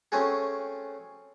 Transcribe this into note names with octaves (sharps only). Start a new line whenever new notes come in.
A3 C4 C#4 F#4 G#4